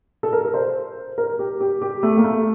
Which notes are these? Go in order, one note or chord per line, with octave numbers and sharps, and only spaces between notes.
A4
A#4
A#4
C5
A#4
G4
G4
G4
A3
A#3
A3